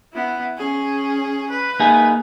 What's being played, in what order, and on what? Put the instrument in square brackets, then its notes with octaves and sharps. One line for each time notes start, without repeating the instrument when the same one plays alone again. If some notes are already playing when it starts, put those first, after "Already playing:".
[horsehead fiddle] B3 E4
C#4 G#4
B4
[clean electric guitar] A#3 D#4 G#4